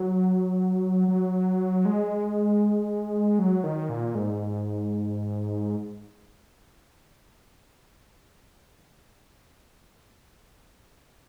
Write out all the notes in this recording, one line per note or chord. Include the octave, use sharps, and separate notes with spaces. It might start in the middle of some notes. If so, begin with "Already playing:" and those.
Already playing: F#3
F#3
G#3
F#3
D#3
A#2
G#2